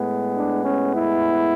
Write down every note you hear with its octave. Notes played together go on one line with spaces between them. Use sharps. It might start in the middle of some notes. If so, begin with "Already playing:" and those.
Already playing: A2 G#3 B3
D4
C#4
E4